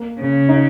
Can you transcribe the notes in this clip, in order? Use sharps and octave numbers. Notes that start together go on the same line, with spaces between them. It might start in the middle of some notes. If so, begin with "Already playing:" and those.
Already playing: A#3
C#3
D#4